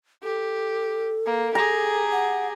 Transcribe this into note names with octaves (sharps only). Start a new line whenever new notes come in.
G4 A4
A#3
G4 G#4 A#5
F#5